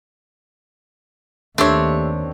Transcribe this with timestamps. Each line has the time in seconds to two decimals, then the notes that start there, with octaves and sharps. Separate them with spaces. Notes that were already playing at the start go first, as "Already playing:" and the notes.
1.58 D#2 A3 C4 D4 G4 C#5 E5